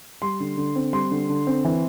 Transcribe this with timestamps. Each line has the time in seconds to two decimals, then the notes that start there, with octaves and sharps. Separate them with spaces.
0.22 G3 C6
0.40 D3
0.57 D3
0.76 C4
0.93 G3 C6
1.11 D3
1.29 D3
1.47 C4
1.65 E3